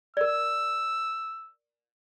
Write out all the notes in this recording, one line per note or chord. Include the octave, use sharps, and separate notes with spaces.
A#4 D5 E6